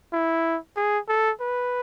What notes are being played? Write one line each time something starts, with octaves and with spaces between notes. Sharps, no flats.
E4
G#4
A4
B4